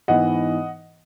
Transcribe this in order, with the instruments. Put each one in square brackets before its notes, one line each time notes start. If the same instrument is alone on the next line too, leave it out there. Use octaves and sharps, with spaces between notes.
[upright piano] G#2 E3 B3 D#5 F#5